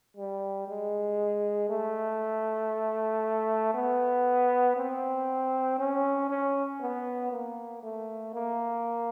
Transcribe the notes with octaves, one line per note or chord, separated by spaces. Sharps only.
G3
G#3
A3
B3
C4
C#4
C#4
B3
A#3
A3
A#3